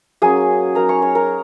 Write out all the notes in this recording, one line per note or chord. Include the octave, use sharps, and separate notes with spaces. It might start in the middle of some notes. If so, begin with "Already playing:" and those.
F#3 A#3 C#4 G#4 G#5
F#3 D#4 A#4 A#5
C#5 C#6
C#5 C#6
A#4 A#5